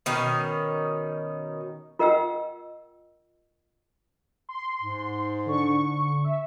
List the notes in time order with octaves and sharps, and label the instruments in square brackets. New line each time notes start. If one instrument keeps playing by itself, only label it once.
[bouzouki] B2 D#3 C#4
[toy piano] F4 A#4 D#5 F#5 G5 E6
[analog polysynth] C6
[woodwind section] G#2
[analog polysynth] D3 C#6
E5